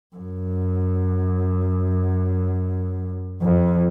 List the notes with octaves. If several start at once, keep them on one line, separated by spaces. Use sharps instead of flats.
F#2
F2